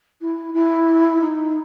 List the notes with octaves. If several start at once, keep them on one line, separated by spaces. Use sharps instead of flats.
E4
E4
D#4